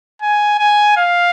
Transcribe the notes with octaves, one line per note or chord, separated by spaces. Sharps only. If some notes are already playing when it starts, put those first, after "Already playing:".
G#5
G#5
F5